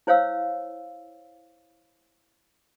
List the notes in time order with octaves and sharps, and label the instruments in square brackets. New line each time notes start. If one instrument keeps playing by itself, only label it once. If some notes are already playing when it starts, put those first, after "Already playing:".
[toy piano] E4 C5 C#5 F5 E6